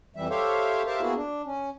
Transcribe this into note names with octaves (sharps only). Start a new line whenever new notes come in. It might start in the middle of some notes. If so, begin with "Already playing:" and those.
F2 E3 G3 E5
G4 A4 C5 C#5 E5 F5
G4 A#4 C5 E5 F5 A5
A#3 B3 E4 F#4 G#4
D4
C#4